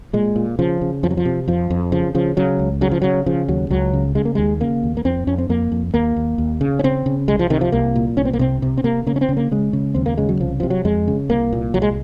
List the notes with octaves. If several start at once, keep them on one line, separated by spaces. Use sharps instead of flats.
A#2 G#3
A#2
C#3 F3
C#3
F2 F3
F#3
F3
C3
F2 F3
F2
C#3 F3
C#3 F3
C#3 F#3
C#2
C#3 F#3
F3
C#3 F#3
C#3 F3
D#2 F#3
C#2 F#3
C#3
C#3 G#3
A#3
D#2 G#3
C#3 A#3
D#2
A#3
F2 C4
F2 C#4
C4
F2 A#3
F2
D#2 A#3
D#2
D#2
C#3
C#4
C#3 C4
C#3
C2 G#3
F3
C3 D#3
F3
C2 A#3
A#2
C2 C#4
C4
A#3
C3 C4
C3
C4
C3 A#3
C#3 A#3
C#4
C4
C#3
A#3
C#3 G#3
C#3
D#2 C4
A#3
C#3 G#3
F#3
C2 F3
C3 F3
F#3
F2 G#3
C#3
C2 A#3
A#2
C2 F#3
G#3